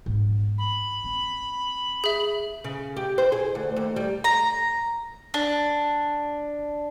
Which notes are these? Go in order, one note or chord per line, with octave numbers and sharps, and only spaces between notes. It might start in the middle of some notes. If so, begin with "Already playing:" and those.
G#2 B3
B5
C4
G#4 E5
C#3
G4
C5
G#4
D2
D#2
G3
A#5
D4